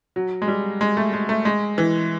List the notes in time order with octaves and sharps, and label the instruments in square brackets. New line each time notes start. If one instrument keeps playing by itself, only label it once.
[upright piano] F#3
G#3
G3
G#3
A3
G#3
A3
G#3
E3